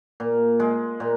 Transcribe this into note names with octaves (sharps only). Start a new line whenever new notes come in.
A#2
G#3
A#2